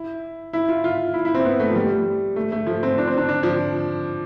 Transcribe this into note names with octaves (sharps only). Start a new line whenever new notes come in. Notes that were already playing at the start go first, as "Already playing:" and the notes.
Already playing: E4
E4
F4
F4
E4
E4
C4
B3
A3
F3
G3
A3
A3
F3
C4
D4
C4
D4
D4
F3